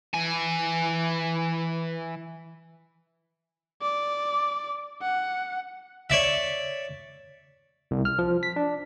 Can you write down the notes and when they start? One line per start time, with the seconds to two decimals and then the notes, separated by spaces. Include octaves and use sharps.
0.14 E3 G#5
3.82 D5
5.02 F#5
6.10 C#5 D5 E5
7.91 C2
8.05 F6
8.19 F3
8.43 B6
8.56 D4